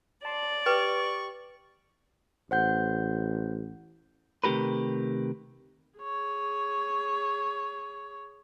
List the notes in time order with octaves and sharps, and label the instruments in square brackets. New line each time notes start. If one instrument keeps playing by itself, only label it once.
[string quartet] D5 [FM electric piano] A5 C6
[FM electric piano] G4 [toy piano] B4 [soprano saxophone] C#6
[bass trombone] A1 [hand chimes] C5 F#5 G6
[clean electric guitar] C3 D#3 A3 G4 A#4 B4
[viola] G#4 C#5